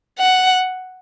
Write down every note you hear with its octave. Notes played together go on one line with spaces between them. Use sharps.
F#5